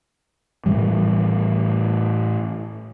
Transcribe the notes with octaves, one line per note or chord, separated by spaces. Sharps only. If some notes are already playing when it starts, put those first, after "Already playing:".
A2 E3 G3